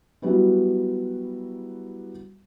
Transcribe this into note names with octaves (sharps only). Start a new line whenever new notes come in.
F#3 G3 B3 E4 F#4